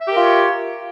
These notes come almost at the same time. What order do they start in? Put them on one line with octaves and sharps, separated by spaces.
E5 G4 A#4 F4 C#5